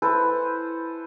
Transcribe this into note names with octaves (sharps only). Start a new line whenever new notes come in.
E4 A4 B4 C5